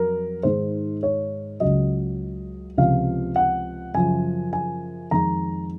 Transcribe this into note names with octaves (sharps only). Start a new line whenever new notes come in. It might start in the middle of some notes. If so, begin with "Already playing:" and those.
Already playing: F2 F#3 A#4
G#2 D#3 G#3 C5
C#5
C#2 C#3 F#3 D#5
C#2 C3 F3 F5
F#5
F#2 C#3 F3 G#5
G#5
F2 D#3 G#3 A#5